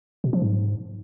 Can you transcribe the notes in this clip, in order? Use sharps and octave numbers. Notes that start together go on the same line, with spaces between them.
B2
F3
G#2